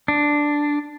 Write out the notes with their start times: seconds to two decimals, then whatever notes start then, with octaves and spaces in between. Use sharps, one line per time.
0.08 D4